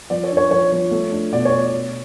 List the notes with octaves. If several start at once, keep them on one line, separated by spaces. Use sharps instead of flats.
F3 D5
C#5
D4
C#5
F3 C#5
F3
A3
D4
B2 D5
C#5
B2
B2